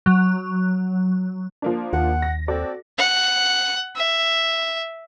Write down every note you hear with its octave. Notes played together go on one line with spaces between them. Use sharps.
F#3
F3 A#3 D4
D#2 F#5
A#6
C4 F#4 A4 D5
F#5
E5